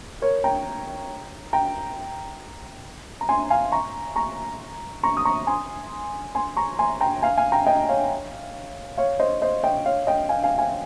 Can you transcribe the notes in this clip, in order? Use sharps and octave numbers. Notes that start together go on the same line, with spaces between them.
A#4 C#5
G5 A#5
G5 A#5
A#5
G#5 C6
F5 G#5
A#5 C#6
A#5 C#6
A#5 C#6
D#6
A#5 C#6
G#5 C6
G#5 C6
A#5 C#6
G#5 C6
G5 A#5
F5 G#5
F5 G#5
G5 A#5
D#5 G5
C#5 F5
C#5 F5
C5 D#5
C5 D#5
D#5 G5
C#5 F5
D#5 G5
F5 G#5
F5 G#5
F5 G#5